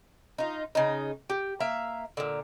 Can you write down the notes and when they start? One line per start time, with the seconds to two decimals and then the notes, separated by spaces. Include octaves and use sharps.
0.38 D#4 F4
0.75 C#3 D#4
1.30 G4
1.60 A#3 E5 F5
2.17 A#2 D3